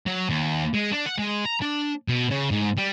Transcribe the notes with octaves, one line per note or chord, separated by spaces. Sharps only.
F#3
D#2
G#3
D4
F#5
G#3
A#5
D4
B2
C#3
G#2
G3